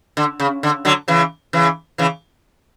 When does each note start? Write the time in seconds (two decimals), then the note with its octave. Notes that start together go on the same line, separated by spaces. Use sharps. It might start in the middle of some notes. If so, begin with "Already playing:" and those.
0.17 D3
0.40 C#3
0.63 D3
0.85 D3 F#3
1.08 C#3 E3
1.53 C#3 E3
1.98 C#3 E3